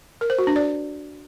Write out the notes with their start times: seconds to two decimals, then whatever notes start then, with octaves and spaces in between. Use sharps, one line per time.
0.21 A#4
0.30 C5
0.38 F#4
0.47 D4
0.56 D5